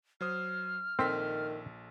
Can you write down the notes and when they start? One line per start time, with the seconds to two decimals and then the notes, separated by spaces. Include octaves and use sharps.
0.21 F#3 C5 D#6 F6
0.99 A#1 D#3 C4 A4 B6